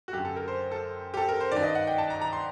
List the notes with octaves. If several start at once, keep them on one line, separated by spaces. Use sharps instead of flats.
F#4
F#2 D3 G4
A4
A#4
C5
A4
G4
A4
A#4
C5
G2 D#3 D5
D#5
F#5
G5
A5
A#5
A#5
C6